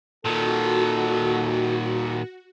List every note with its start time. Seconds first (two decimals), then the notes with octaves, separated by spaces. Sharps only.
0.25 A#2 D#3 F#4 A4